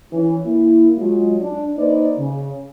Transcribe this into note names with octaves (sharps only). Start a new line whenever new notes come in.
E3 C#4 E4
A#3 E4
F#3 G#3 F4
D4
A#3 D#4 B4 C5 D5
C#3